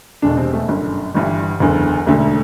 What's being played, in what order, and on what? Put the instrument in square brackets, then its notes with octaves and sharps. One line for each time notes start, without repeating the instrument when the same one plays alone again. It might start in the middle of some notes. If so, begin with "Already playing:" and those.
[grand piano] E1 E2 B2 D3 D4
C3 C4
A3
G1 F#2 D3
G1 G2 E3
F#1 E2 D3
E1 D2 D3 A3